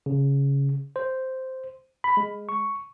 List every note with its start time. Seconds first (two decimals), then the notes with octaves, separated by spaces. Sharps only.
0.06 C#3
0.96 C5
2.04 B5
2.17 G#3
2.49 C#6